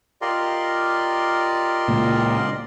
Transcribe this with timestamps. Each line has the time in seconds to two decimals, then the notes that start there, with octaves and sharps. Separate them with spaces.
0.22 F4 G4 A#4 D5 D#5 C6
1.88 C#2 A#2 A#3